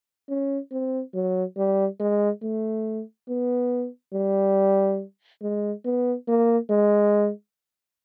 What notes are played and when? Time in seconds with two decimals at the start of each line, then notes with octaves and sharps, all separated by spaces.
0.29 C#4
0.71 C4
1.14 F#3
1.57 G3
2.00 G#3
2.42 A3
3.28 B3
4.14 G3
5.42 G#3
5.85 B3
6.28 A#3
6.70 G#3